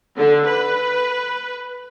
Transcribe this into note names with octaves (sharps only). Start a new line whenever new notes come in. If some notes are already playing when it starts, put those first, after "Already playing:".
D3
B4